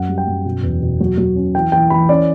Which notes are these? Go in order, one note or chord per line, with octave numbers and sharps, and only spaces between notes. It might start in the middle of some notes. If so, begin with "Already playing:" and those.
Already playing: F#2 F#5
G3
G5
F#2
B2
E2
B2
F#3
F#3
C#4
E3 G5
E3 G5
E3 B5
C#4 D5